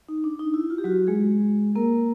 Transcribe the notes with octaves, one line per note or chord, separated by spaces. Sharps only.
D#4
D4
D#4
E4
F4
G4
F#3 F#4
G#3 G#4
A#3 A#4